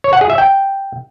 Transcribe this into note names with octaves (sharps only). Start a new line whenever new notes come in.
C#5
F#5
G#4
E5
G5